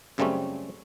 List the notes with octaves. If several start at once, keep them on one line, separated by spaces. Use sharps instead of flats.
F#2 C#3 G3 A3 C4 C#4